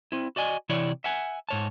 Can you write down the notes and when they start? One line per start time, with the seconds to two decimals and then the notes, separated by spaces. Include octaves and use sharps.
0.12 C4 E4
0.36 F#4 D5 D#5 G#5
0.69 C3 E3 E4 C#5 D5
1.04 E5 F#5 G#5
1.49 G#2 C#5 A5